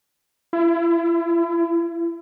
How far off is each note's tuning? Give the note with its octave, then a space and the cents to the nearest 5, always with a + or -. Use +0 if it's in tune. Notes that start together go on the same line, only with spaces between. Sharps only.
E4 +35